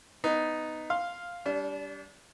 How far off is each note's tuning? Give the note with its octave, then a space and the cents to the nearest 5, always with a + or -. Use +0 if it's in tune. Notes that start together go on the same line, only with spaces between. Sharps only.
B3 +10 D#4 +0
F5 +0 C6 +0
G3 +0 D4 -35